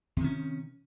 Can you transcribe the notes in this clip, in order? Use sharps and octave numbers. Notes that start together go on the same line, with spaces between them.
C3 D#3 C#4